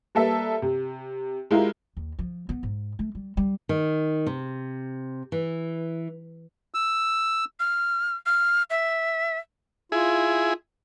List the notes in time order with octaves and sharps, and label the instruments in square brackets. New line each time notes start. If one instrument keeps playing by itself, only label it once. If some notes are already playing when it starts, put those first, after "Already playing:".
[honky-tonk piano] G3 A#3 A4 B4 E5
C3
G#3 E4 F4 G4 A#4
[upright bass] D#2
F3
B3
G#2
A3
G3
G3
[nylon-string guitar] D#3
C3
E3
[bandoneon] E6
[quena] F6
F6
E5
[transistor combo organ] E4 G#4 [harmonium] F4